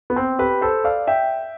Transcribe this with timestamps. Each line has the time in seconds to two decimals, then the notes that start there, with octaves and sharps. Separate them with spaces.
0.10 B3
0.16 C4
0.39 G4 B4
0.62 A4 C5
0.84 D5 F5
1.07 E5 G5